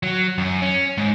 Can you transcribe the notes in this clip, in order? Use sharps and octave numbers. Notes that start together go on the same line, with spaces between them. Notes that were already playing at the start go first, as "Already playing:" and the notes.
F#3
F#2
C#4
G#2